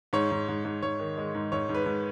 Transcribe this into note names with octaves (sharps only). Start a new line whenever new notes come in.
G#2 C#5
G#2
G#2
G#2
G#2 C#5
D#3
G#3
G#2
G#2 C#5
G#2
B4
G#2